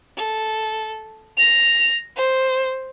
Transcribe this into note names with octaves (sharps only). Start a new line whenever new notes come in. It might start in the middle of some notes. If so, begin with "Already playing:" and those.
A4
A#6 F7
C5